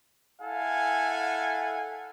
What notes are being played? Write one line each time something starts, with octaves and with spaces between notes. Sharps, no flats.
E4 A4 F5 F#5 G#5